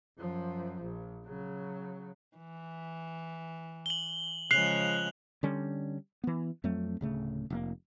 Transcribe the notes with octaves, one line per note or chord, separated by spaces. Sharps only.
F#2 F3
A#1
C#3 F#3
E3
F#7 G7
C#3 F3 G#3 F#6 C7 F7 F#7
D3 G3 C#4
E3 B3
F2 F#3 A3 C4
D1 C#3 A3
F1 D3 A#3